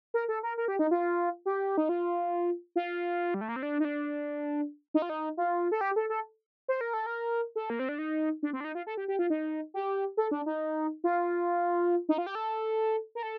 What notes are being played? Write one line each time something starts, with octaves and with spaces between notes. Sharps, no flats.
A#4
A4
A#4
A#4
G4
D#4
F4
G4
D#4
F4
F4
G3
A3
A#3
C4
D4
D#4
D4
D#4
F4
D#4
F4
A4
G4
A4
A4
C5
A#4
A4
A#4
A4
A#3
C4
D4
D#4
D4
C4
D4
D#4
F4
A4
G4
G4
F4
D#4
G4
A4
D4
D#4
F4
D#4
F4
G4
A4
A#4
A4